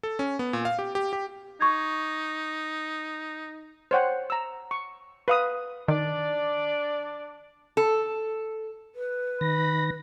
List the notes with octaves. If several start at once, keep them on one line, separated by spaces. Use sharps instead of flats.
A4
C#4
B3
A#2
F5
G4
G4
G4
D#4 C#6 G#6
C5 C#5 F#5 G5
A#5 E6
C#6
B4 F5 D#6
D#3 D4 D5
A4
B4
D#3 B5 A#6